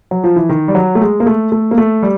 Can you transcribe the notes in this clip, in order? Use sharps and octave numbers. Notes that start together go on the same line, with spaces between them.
F#3
F3
E3
D#3
G3
F#3
A3
G#3
A#3
A3
A3
A#3
A3
G3